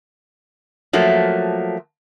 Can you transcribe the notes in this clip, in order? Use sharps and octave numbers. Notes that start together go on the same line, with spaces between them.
F3 F#3 A3 A#3